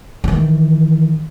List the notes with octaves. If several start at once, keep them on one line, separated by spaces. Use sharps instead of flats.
D#3 E3